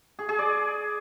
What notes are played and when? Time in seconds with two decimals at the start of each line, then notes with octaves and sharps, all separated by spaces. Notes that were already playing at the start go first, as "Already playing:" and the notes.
0.19 G#4
0.29 G#4
0.39 D5